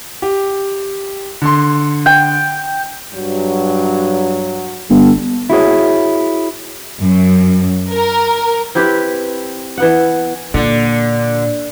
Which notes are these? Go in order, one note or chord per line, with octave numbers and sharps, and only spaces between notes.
G4
D3 C6
G5
G2 F#3
G1 A4
E4 F#4 G#4 C#5
F#2
A#4
C4 E4 G4 B4
E3 B3 F#5
A#2 D3